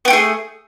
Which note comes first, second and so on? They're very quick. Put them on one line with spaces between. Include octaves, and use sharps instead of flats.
B3 G4 A3 G#4